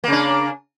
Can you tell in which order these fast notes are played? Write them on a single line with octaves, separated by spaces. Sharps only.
A#3 C#3 D4